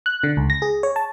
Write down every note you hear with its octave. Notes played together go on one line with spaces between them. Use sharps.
F#6
D3
C#2
A#6
G#4
C#5
A5